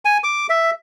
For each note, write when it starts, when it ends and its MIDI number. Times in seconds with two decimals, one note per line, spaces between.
0.05 0.18 80
0.24 0.47 86
0.50 0.71 76